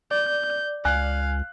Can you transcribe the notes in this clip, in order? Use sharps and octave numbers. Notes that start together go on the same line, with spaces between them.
D5 G6
C#2 F5 G#5 F#6